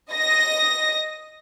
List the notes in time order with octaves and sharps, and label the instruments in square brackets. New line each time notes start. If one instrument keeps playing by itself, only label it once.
[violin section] D#5 A#6